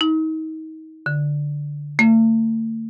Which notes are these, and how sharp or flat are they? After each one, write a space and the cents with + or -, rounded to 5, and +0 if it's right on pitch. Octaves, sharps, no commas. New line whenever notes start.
D#4 +30
D3 -5
A3 +40